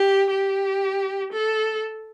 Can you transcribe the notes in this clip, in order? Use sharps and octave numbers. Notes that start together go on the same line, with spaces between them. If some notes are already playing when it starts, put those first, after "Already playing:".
Already playing: G4
G4
A4